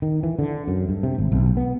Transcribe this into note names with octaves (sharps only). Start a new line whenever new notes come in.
D#3
E3
D3
F#2
G2
C3
G#1
B1
B3